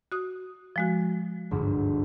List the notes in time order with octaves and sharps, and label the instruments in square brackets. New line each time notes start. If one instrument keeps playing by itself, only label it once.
[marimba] F#4 D#6
F3 G#3 F#4
[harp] G1 D2 G#2